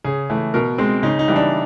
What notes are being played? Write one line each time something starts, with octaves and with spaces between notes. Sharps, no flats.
C#3 G#4
E3 A3
B2 A#4
G#3 C4
C#3 D#4
D#4
E3 G3
D4